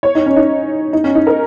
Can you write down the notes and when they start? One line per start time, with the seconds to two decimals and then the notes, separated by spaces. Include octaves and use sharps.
0.03 C#5
0.15 D#4
0.26 C#4
0.36 D#4
0.93 D#4
1.04 C#4
1.15 D#4
1.27 A#4